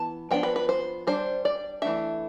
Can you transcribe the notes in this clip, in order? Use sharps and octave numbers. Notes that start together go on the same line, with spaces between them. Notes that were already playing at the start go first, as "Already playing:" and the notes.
Already playing: E3 B3 A5
F3 B3 D4 G5
B4
B4
C5
G3 D4 C5
D5
E3 A3 D4 E5